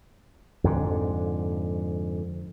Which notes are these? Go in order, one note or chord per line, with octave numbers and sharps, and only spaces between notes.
F2 G#2 D3